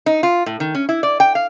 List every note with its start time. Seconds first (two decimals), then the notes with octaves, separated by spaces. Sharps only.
0.06 D#4
0.23 F4
0.46 A2
0.60 D#3
0.75 C#4
0.89 E4
1.03 D5
1.20 G5
1.35 F5